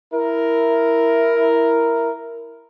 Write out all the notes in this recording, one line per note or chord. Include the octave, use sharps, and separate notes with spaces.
E4 A#4